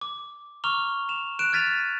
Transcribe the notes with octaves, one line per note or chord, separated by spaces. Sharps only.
D6
A#5 C#6 D6 F6 F7 G7
E7 F7
F#6 D7 E7
F6 G#6 A6 B6 D#7 F7